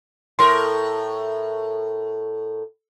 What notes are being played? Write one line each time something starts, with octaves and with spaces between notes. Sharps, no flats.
A2 A#4 C6